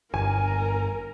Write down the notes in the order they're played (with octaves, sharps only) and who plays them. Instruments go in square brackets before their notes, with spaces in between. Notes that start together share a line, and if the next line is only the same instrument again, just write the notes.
[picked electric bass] G1 [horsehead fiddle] A#4 [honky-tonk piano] G#5